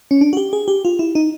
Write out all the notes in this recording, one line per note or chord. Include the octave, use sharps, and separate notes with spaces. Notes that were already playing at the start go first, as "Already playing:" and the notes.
C#4
D4
F#4
G4
G#4
G4
F4
E4
D#4